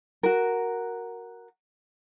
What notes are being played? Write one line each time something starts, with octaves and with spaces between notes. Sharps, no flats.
F#4 A#4